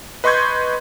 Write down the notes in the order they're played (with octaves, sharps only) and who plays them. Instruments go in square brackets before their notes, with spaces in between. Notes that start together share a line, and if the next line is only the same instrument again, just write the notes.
[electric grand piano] B4 D#5 C6 C#6 G6 G#6